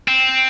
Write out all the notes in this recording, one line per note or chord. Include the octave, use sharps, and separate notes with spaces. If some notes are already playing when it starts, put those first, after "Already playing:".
C4